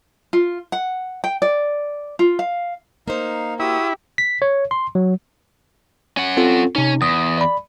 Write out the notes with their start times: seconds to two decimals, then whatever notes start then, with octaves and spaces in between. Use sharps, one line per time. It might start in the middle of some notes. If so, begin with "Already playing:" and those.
0.33 F4
0.72 F#5
1.24 G5
1.42 D5
2.19 F4
2.39 F5
3.08 A#3 D#4 C5 F5
3.60 E4 F#4 G4 D#6 E6
4.18 B6
4.42 C#5
4.71 C6
4.95 F#3
6.17 C#4 F#5
6.37 C4 F4 A4
6.75 C3 C#4 D#4
7.02 E2 D#6
7.38 D5 B5